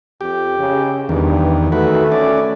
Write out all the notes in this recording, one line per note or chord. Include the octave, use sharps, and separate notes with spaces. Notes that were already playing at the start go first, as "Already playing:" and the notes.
F2 G4
C#3
E2 G2 D#3
D#3 A3 F#4 B4
C#4 D5